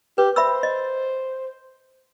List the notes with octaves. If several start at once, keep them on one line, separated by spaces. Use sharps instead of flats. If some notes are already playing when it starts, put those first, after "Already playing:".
G4 B4
C5 E5 B5 E6
D#5